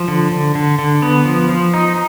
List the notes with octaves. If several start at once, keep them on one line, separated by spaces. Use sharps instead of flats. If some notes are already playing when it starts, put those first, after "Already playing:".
Already playing: F3
D3
D3
D3
D3
B3
F3
F3
D#4